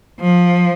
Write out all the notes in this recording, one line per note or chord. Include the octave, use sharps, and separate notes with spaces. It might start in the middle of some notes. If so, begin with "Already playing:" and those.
F3